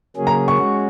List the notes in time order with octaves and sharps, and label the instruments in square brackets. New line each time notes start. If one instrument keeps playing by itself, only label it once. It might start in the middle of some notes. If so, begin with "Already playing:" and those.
[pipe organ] C#3 F#3 A#3 C#4 G#4
[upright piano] A#5
C#6
[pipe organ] G#3 C#4 F#4